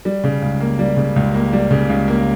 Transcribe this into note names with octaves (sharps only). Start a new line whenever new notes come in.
G3
C#3
C#2
A#3
G3
C#3
C#2
A#3
G3
C#3
C#2
A#3